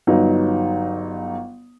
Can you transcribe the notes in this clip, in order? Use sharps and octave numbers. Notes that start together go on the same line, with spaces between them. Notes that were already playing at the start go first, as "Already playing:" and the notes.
G1 F#3 D#4 B4